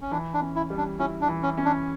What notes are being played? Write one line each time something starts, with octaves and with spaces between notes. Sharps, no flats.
C#4
E3 D4
D4
C#4
E4
G3
D4
C#4 E4
D4
E3
C#4
C#4
D4